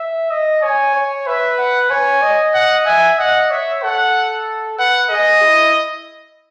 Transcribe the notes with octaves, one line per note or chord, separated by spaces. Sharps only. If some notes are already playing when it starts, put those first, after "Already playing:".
Already playing: E5
D#5
C#5 G#5
C#5
B4 E5
F#5
C#5 G#5
D#5
F#5
E5 G#5
D#5 F#5
C#5 E5
A4 F#5
B4 F#5
G#4 D#5
E4